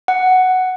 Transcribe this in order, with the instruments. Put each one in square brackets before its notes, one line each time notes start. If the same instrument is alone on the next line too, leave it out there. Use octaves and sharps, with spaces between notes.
[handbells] F#5